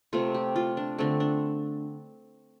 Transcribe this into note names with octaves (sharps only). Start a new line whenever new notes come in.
C3 A3 F4
G4
F4
D4
D3 A3 C4
D4